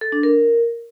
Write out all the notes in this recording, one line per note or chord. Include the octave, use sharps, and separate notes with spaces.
A4
D4
A#4